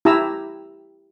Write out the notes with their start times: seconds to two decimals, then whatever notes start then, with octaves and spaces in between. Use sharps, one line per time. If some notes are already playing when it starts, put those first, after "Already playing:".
0.05 E4 G4 A5 A#5 E6